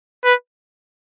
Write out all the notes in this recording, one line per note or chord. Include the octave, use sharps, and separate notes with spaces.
B4